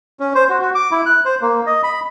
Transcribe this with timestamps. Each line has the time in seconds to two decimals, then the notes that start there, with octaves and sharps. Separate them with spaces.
0.20 C#4
0.35 C5
0.49 F#4
0.61 F#4
0.75 D6
0.91 E4
1.06 F#6
1.25 C5
1.42 A#3
1.66 D#5
1.83 B5